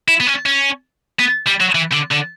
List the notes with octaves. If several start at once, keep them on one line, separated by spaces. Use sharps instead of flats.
E4
B3
C#4
C#4
B3
G3
F#3
E3
D3
D3